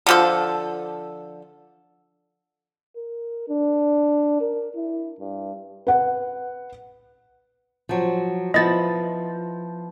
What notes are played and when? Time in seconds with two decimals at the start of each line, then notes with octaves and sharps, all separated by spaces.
0.07 D3 F3 A4
2.96 A#4
3.49 D4
4.41 A#4
4.76 E4
5.20 G2
5.87 B4 F#5
7.89 F3 F#3
8.54 F3 B3 E4 D#5 A6